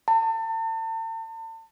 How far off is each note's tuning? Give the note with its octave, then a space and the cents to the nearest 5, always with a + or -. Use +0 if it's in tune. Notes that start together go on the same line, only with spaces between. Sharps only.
A5 +40